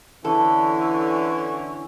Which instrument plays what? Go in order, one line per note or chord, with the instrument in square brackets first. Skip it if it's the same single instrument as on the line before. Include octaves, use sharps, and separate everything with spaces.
[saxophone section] D3 E3 [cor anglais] C#4 [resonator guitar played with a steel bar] A4